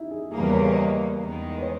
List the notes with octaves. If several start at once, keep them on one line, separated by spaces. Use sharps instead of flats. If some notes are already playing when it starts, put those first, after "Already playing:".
Already playing: D#4 E4 G4
G#4
E2 C#3 G3 A#3 G#4
A#4
B4
C#5
C#5
D#5
E2 D#3 G#3
B4
C#5